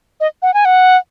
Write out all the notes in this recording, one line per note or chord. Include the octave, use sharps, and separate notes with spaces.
D#5
F#5
G#5
F#5